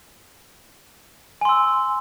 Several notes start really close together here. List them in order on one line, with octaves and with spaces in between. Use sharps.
G#5 C6 E6